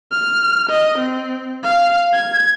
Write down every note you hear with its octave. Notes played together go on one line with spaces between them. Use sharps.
F6
D#5
C4
F5
G#6